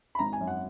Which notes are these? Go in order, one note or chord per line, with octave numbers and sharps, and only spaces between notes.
B5
G#1 A#5
G#5
F#2
F#5